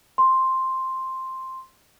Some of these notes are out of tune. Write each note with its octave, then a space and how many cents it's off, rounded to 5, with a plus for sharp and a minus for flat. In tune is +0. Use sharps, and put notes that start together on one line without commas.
C6 +5